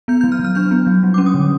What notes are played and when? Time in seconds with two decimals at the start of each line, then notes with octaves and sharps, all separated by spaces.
0.08 B3 G6
0.21 F#3 G6
0.32 F6
0.39 F#3
0.44 F6
0.55 D4 G6
0.71 B3
0.87 F#3
1.03 G3
1.14 C#4 D6
1.26 D#6
1.34 D3